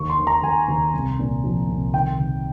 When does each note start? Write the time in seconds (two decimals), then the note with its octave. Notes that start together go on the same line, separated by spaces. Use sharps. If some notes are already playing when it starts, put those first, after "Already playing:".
Already playing: D#2 D#3 C#6
0.10 C6
0.19 D#3
0.27 A#5
0.43 D#2 G#5
0.68 D#2
0.93 C2
1.19 A#2
1.44 F3
1.68 C2
1.93 D#3 G5
2.19 D#3